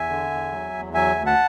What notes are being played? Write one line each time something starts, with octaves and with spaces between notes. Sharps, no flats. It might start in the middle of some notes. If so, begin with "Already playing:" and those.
Already playing: E2 E5 G#5
D3
E2
F#3
E2
F#3 E5 G#5
D2
F#5 A5